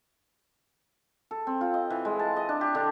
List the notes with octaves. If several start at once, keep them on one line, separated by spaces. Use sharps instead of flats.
A4
C4
F4
D#5
E3
G#3
A5
D#5
D4
G4
D3